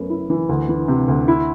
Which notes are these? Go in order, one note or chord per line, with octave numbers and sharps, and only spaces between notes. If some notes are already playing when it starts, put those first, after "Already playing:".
Already playing: F#2 A3 B3
E4
E3
D2
E3
C3
D2
E4